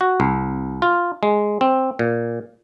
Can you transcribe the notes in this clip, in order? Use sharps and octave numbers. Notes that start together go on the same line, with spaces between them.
F#4
C2
F4
G#3
C4
A#2